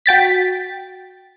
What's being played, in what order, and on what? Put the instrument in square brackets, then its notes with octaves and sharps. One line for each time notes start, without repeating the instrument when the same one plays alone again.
[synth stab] F#4 G5 A6 B6